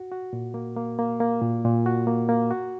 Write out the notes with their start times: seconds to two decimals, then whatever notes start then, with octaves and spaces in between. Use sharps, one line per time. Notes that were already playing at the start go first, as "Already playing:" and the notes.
Already playing: F#4
0.12 F#4
0.33 A#2
0.54 A#3
0.76 A#3
0.99 A#3
1.20 A#3
1.42 A#2
1.64 A#2
1.86 F#4
2.07 A#3
2.29 A#3
2.51 F#4